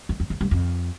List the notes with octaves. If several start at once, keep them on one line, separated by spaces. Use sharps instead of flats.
F2
F2
E2
G2
F2